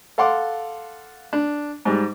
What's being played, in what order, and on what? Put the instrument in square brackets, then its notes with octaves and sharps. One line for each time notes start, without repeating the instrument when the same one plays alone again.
[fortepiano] A4 F5 F#5 C6 D6
D4
G#2 G3 G#3